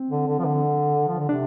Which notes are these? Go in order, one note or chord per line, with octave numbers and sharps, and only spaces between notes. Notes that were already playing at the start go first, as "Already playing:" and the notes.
Already playing: C4
D3
D3
F3
D3
F3
D3
C3 D4